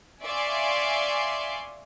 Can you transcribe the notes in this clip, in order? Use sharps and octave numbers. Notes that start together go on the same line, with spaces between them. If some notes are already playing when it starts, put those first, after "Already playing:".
D5 E5 F5 G#5 C6 C#6